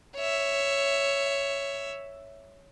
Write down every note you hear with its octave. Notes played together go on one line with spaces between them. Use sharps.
C#5 E5